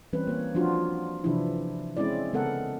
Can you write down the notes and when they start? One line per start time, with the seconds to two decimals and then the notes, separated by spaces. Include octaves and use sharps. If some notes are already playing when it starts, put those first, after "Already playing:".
0.13 E3 G3 C4 C#4 B4
0.27 A#3 C#5
0.55 F3 D4 F4 F#4
1.24 C3 E3 F3 D4 E4
1.97 G#3 C4 C#4 E4 D5
2.33 C#3 G#3 B3 A4 A#4 F#5